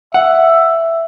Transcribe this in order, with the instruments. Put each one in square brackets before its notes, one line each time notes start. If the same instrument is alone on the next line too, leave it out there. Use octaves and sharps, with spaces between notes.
[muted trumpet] E5 [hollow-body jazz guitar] F#5